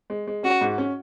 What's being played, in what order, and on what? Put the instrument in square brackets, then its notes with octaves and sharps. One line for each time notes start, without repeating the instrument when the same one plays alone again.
[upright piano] G#3
G#3
[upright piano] C#4 [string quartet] F#4
[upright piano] G#2
C#4